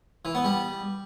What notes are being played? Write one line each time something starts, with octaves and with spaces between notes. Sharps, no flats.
E3
B3
G3